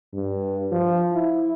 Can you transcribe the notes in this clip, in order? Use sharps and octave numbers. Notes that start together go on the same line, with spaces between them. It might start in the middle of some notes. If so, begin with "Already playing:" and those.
G2
F3
E4